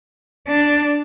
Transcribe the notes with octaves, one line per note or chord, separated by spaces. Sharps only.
D4